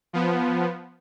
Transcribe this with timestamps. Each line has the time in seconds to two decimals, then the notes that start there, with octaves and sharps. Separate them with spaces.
0.13 F3 B3